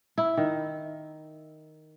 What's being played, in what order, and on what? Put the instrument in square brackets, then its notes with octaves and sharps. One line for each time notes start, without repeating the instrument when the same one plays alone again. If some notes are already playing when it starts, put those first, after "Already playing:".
[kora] E4
D#3